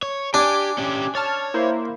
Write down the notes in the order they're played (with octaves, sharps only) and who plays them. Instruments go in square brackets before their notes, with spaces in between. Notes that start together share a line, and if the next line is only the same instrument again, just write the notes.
[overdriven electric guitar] C#5
[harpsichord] D4 [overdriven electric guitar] G4 [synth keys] G#5 D6
[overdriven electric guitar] C#4 G4
[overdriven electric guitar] C#5 [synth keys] A5 F6 A6
[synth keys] A#3 E4 C5